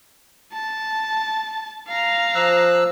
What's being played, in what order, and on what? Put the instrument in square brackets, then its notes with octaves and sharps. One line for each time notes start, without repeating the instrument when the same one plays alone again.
[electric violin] A5
F5 A#5
[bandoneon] F3 E6 F#6